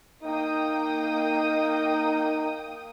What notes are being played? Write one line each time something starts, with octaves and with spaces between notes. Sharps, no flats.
A#3 D#4 G5 D#6